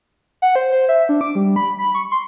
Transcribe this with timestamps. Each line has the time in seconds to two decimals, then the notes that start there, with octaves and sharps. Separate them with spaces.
0.42 F#5
0.56 C5
0.72 C5
0.89 E5
1.09 D4
1.21 D6
1.35 G3
1.56 B5
1.78 B5
1.95 C#6
2.12 C6